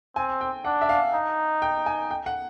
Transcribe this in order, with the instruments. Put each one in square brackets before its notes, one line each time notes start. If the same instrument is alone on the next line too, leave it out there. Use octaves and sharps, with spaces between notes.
[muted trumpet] C4 [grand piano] G#5
[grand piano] G5
[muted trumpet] D4 [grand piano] F#5
[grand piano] E5
F5
[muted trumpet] D#4
[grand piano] G5
G#5
G5
F#5